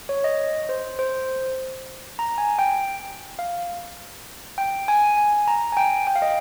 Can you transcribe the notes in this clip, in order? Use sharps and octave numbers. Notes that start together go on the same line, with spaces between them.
C#5
D#5
C5
C5
A#5
G#5
G5
F5
G5
G#5
G#5
A#5
G#5
G5
G5
F5
D#5